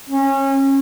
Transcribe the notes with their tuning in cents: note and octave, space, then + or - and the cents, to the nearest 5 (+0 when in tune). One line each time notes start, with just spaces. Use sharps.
C#4 -25